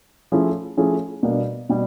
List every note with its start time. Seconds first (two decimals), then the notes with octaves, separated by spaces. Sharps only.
0.32 F3 A3 C#4 E4 G#4
0.77 F3 A3 C#4 E4 G#4
1.23 B2 G3 A#3 D4
1.69 B2 G3